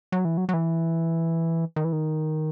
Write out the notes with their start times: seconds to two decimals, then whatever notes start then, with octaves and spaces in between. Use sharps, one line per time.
0.12 F#3
0.25 E3
0.37 F#3
0.49 F#3
0.54 E3
1.76 D#3
1.84 E3
1.93 D#3